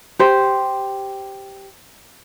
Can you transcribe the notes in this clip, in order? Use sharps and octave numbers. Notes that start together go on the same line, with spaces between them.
G4 C5